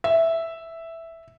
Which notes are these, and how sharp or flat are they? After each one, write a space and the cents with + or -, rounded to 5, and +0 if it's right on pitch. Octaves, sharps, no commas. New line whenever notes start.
E5 +0